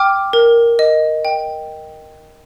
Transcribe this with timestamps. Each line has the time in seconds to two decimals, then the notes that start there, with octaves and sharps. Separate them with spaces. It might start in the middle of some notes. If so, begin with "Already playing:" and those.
Already playing: G5 D6 F6
0.33 A#4
0.79 D#5
1.25 G5